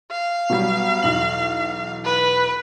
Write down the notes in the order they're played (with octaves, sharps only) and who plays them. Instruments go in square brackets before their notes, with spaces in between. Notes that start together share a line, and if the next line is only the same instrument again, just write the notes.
[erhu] F5
[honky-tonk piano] B2 F#3 G3
B1 E2 F#7
[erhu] B4